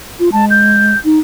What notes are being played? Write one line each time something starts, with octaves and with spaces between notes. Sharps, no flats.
F4
G#3 A5
G6
D#4